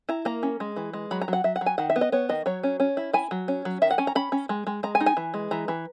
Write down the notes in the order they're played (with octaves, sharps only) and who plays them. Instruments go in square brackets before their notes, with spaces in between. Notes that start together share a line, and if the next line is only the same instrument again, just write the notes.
[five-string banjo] E4 A#5
A#3 A#5
C#4
G#3
E3
G#3
F#3 B5
A#5
F#3 F#5
F#3 E5
F#5
F#3
G#5
D#3 F#5
E5
B3
D#5
B3 C#5
D#3 D#5
F#3 C#5
C#4
C#4
E4
E4 G#5
F#3
C#4
F#3
D#3 E5
F#5
C#4 G#5
A#5
C#4 B5
C#4
G#3
G#3
G#3 A#5
G#5
D#4
G#5
E3
G#3
E3 A#5
E3